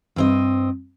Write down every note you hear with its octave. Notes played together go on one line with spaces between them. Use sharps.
G2 C4 D#5